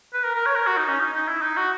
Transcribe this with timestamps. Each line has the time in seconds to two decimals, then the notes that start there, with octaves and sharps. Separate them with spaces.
0.14 B4
0.24 A#4
0.35 A#4
0.46 C#5
0.56 A#4
0.67 F#4
0.77 D#4
0.89 C#4
1.00 D#4
1.13 D#4
1.28 E4
1.42 D#4
1.57 F#4